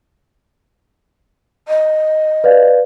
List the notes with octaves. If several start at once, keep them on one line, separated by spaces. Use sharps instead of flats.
D#5
B4 D5 F5